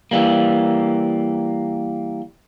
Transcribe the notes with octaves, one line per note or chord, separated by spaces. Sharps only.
E3 G3 A#3